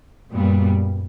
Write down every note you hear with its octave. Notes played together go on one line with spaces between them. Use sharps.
F#2 A#2 G3 B3